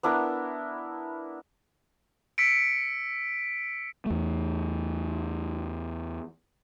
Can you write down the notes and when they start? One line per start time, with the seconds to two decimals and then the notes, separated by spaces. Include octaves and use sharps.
0.03 B3 D4 E4 A#4
2.38 E6 B6 C#7 D7
4.06 E2 A3